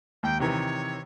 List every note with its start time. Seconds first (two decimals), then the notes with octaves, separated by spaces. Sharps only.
0.23 D#2 G5
0.40 C3 D#3 E3 C#5